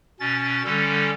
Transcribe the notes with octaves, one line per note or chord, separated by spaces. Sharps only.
B2 C#4 A6
D3 G3 C#4 A4